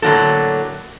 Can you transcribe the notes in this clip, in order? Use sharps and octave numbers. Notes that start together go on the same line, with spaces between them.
A2 D3 F#3 A#3 A4